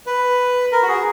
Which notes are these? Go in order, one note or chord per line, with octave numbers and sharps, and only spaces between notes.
B4
A#4
F#4
G#4